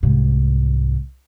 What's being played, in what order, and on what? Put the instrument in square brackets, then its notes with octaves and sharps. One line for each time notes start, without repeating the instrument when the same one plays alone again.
[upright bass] C2 G#2